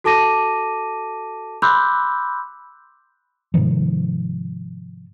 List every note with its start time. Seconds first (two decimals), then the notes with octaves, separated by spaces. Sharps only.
0.04 F#4 A4 A5 D6 A#6 D#7
1.62 B5 C6 D6 E6 F#6 G6
3.54 G#2 C3 D#3 F3